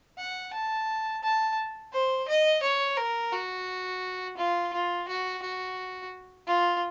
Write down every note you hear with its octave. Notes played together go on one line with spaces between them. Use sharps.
F#5
A5
A5
C5
D#5
C#5
A#4
F#4
F4
F4
F#4
F#4
F4